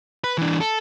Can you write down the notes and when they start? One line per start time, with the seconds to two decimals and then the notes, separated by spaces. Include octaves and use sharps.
0.24 B4
0.38 E3 D4
0.61 A4